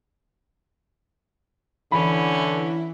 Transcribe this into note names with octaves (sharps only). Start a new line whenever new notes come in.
D3 E3 C#4 E4 B5